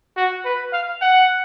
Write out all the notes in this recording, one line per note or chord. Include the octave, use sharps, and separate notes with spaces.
F#4
B4
F5
F#5